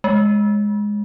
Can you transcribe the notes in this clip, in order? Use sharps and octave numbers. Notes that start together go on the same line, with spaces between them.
G#3